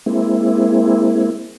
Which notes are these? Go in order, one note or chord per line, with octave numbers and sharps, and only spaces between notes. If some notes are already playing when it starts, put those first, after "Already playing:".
G#3 A#3 C4 E4